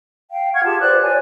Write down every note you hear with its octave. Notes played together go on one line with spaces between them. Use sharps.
F5 G5
F#5 C#6 F6 G#6
F4 G4 G#4 A5
B4 C5 D5 F#6
C#5 D5 G#5